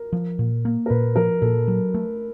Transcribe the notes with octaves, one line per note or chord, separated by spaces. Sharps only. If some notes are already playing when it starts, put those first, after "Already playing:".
Already playing: A#4
F3
A#2
A#3
A#4
A#2 B4
F3 A#4
A#2 A4
F#3
A3